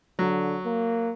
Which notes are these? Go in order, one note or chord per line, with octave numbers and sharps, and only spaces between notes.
D3 F#3
A#3